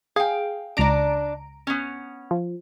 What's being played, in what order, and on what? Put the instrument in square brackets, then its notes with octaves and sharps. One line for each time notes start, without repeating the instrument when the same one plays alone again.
[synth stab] G#4 [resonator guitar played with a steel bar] F5 G5
[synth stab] C#2 A#5 D7 [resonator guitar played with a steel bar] D4 D5
[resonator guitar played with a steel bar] B3 C#4
[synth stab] F3